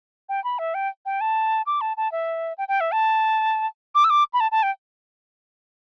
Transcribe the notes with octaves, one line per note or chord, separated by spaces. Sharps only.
G5
B5
E5
G5
G5
A5
D6
A5
A5
E5
G5
G5
E5
A5
D6
E6
D6
B5
A5
A5
G5